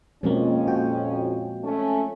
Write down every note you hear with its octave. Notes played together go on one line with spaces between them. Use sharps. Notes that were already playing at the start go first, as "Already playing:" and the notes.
F2 B2 F3 G#3 A#3 C4 C#4
A#2 F#4 G5
A3 C#4